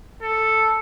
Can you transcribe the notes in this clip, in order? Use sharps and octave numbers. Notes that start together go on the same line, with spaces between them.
A4